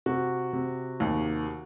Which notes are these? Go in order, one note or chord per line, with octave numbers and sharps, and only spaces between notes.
C3 F#4
C3
D#2